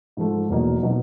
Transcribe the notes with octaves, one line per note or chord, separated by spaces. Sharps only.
G#2 F3 A3
E2 B2 F#3 A#3 D#4
B2 F#3 A#3 D#4